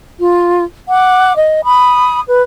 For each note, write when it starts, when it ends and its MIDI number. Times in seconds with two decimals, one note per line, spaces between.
0.19 0.63 65
0.88 1.33 78
0.88 1.33 86
1.36 1.64 75
1.64 2.21 83
1.64 2.21 87
2.28 2.43 71